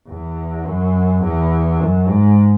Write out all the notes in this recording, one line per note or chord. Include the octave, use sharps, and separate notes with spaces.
E2
F#2
E2
F#2
G#2